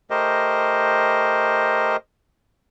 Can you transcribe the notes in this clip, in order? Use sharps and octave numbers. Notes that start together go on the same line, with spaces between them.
A3 G4 A#4 C5 D#5